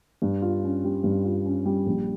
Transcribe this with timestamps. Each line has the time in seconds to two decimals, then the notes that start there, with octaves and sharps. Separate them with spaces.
0.22 G2
0.42 F4
0.64 C#4
0.84 G3
1.04 G2
1.25 F4
1.46 C#4
1.65 G3
1.86 A#1